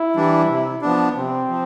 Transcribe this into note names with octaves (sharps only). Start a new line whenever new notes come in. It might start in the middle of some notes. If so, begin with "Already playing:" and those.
Already playing: E4
E3 G3 D4
C3
F3 B3 D4
C3 C4
F3